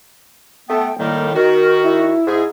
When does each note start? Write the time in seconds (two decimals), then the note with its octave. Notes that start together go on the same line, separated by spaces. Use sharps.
0.69 A3 B3 G5
0.99 A2 D#3 G3 A#3
1.35 D#3 F#4 A#4
1.83 E4
2.27 G#2 G#4